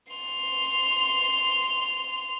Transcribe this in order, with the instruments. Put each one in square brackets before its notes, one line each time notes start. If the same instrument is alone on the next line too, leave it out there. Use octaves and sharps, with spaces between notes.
[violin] C6 F7